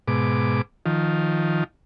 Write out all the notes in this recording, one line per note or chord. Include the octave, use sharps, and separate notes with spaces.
G#2 B2 D6
D#3 F3